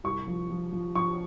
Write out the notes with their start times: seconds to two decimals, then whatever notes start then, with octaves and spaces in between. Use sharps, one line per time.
0.04 C2 C#6
0.27 F3
0.50 F3
0.72 F3
0.95 F3 C#6